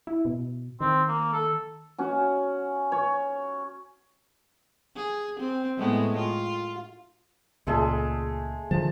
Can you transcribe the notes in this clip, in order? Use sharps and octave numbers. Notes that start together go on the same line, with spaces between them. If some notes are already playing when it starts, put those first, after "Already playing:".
E4
B2
D#3 C4
A#3
A4
C#4 F#4
C#5
G#4
C4
A2 G#3 B3
F4
C#2 A#2 G#3 A3 G#4
D3 D#3 F3 A5